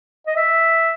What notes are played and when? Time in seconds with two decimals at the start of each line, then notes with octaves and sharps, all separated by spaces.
0.27 D#5
0.36 E5